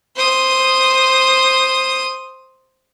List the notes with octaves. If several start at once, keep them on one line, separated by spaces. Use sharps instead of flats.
C5 D#6